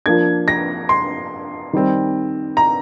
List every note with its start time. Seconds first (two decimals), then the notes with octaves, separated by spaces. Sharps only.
0.06 F3 A#3 D4 G#6
0.48 A#6
0.89 C6
1.73 D#3 G3 C4
2.57 A#5